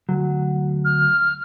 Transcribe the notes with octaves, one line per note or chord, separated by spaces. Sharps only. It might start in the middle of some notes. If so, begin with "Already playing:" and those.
D2 F#3
F6